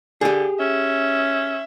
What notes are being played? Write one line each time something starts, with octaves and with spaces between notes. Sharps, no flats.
D3 G4 G#4
C#4 E5